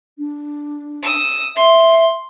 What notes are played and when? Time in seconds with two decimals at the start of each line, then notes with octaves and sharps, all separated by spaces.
0.18 D4
1.03 D#6 E6
1.56 E5 C6